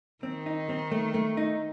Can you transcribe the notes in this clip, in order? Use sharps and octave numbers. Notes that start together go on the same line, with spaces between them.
D#3 C4
D#4
C4
A3
A3
D#4